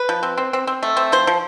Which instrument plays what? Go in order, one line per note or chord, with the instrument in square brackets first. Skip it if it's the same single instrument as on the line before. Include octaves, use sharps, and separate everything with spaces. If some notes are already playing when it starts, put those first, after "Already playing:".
Already playing: [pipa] B4
F3
C4
C4
C4
C4
A3
C4
F3 C5
F3